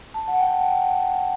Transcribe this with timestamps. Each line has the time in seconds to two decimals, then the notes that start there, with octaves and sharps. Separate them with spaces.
0.14 A5
0.28 F#5
0.40 G5